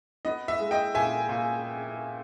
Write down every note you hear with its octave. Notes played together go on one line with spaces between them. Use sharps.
B3 D#5
E5
G#3
D#5 G5
A#2 E5 G#5
A#2